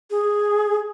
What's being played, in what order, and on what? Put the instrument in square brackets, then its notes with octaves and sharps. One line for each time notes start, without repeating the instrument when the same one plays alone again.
[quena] G#4